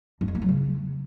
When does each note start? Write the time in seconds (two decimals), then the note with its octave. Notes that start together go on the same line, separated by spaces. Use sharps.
0.21 G2
0.28 F2
0.35 A#3
0.42 F#3
0.49 C#3